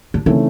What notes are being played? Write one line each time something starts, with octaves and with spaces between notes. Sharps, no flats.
D4
C#3 E3 A3 C4 D#4